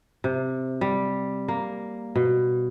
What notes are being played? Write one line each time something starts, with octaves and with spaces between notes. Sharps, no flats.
C3
G3
A#3
B2